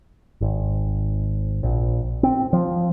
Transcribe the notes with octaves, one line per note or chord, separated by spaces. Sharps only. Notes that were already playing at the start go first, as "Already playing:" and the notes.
G#1
A#1
C4
F3